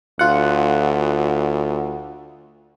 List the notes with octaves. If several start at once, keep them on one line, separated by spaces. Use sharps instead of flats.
D2 F4 F#5